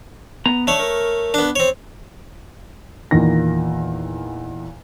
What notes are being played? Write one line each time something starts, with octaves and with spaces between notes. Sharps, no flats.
B3 A#5
A3 D4 C#5
A#4
B3 D4
C4 C#5
E2 A#2 D#3 A#3 A#6